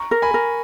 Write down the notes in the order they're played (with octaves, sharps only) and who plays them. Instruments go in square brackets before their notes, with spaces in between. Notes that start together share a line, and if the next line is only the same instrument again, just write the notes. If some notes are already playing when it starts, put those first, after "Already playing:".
Already playing: [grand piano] A#5 C#6
[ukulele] A#4
[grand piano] G#5 B5
[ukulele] A#4